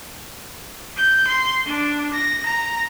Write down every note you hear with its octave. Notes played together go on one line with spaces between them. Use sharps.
G6
C6
D4
A#6
A#5